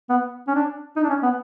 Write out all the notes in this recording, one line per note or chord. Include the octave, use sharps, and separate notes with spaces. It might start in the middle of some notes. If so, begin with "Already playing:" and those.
B3
C#4
D4
D#4
D4
C#4
B3